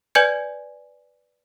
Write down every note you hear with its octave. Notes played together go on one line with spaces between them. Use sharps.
B4 D5 G#5 G6 G#6 C#7